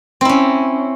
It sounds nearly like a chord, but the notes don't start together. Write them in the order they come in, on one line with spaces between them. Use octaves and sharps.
C4 E4 C#4